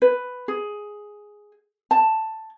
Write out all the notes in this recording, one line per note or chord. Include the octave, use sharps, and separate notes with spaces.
B4
G#4
A5